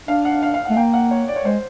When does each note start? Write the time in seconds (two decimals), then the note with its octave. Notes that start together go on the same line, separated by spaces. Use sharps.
0.08 D4 F5
0.25 F#5
0.43 F5
0.54 F5
0.65 A3 F#5
0.77 A#3 G5
0.94 F#5
1.11 C#5
1.28 D5
1.36 C#5
1.45 G#3 C5